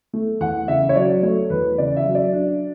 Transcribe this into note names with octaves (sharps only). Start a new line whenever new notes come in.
A3
E2 F#5
C#3 E5
C#5
F#3 D5
A3 C#5
E2 B4
C#3 D5
E5
F#3
D5
D4